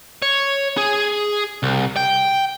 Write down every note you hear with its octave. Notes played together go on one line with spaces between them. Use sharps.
C#5
G#4
C2
G5